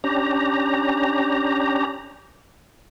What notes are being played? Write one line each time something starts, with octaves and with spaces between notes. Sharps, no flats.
C#4 D4 G4 A#5